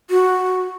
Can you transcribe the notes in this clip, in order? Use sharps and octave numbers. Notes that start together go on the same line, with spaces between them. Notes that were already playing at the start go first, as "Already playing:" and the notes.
F#4